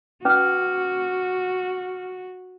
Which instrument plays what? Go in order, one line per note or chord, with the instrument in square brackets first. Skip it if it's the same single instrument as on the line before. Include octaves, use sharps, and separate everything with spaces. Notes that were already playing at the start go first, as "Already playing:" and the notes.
[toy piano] C#4 B4 [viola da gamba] F#4 [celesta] D6 F6